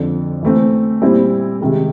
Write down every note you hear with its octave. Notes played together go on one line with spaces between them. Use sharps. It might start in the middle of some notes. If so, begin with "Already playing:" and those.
Already playing: F2 D3 F3
E3 A3 C4
A#2 G3 C4 E4
C3 D#3 G#3